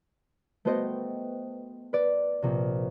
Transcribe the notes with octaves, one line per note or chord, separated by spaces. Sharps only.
A3 B3 F#4 C5 D#5 G5
B4 D5
A#1 C3